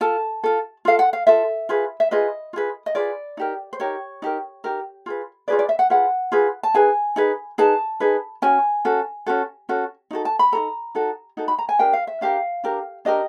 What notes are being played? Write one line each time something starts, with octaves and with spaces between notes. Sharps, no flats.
F4 A4 A5
F4 A4
F4 A4 F5
F#5
F5
F4 A4 E5
F4 G#4 B4
E5
F4 G#4 B4 D#5
F4 G#4 B4
D#5
F4 G#4 B4 D5
D#4 G4 A#4
C5
D#4 G4 A#4 C#5
D#4 G4 A#4
D#4 G4 A#4
F4 G#4 B4
F4 G#4 B4 D5
D5
E5
F#5
F4 G#4 B4 F#5
F4 G#4 B4
A5
D#4 G#4 B4 G#5
D#4 G#4 B4
D#4 G#4 B4 A5
D#4 G#4 B4
C#4 F#4 G#5
C#4 F#4 A4
C#4 F#4 A4
C#4 F#4 A4
D#4 F#4 A4
A5
B5
D#4 F#4 A4 A#5
D#4 F#4 A4
D#4 F#4 A4
B5
A#5
G#5
D4 G4 A#4 G5
F5
E5
D4 G4 A#4 F5
D4 G4 A#4
D4 G4 A#4 D#5